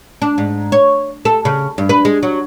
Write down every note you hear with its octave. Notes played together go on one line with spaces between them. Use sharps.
D4
G#2
C#5
A4
C#3
G2
B4
G#3
F#3